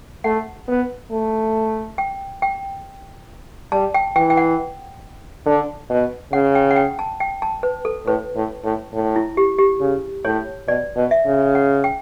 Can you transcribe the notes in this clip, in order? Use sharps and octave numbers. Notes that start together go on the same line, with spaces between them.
A3 F#5
B3
A3
G5
G5
G3 A5
G5
E3 G5
G5
F#5
D3
B2
C#3 F#5
G5
F#5
G5
A5
G5
A5
B4
A4
A2 B4
A2
A2
A2
E4
G4
G4
C#3
A2 C#5
B2 D5
B2
E5
C#3
F#5
G5